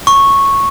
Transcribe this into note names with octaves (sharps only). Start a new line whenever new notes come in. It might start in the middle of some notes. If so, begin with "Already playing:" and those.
C#6